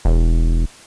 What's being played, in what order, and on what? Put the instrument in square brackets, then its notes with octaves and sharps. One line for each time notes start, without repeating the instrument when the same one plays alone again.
[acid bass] E1